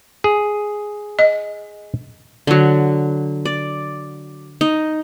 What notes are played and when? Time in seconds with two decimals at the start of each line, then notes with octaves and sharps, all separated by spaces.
0.24 G#4
1.19 D#5
2.47 D3 F#3
3.45 D5
4.61 D#4